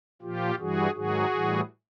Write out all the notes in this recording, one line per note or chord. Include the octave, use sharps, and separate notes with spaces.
A#2 F3 F4 G4
G2 E3 G3 F#4 G#4
G#2 D#3 F#3 F#4 G#4
A2 E3 G3